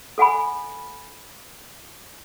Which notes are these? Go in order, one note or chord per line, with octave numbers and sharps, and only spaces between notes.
A4 F#5 G#5 B5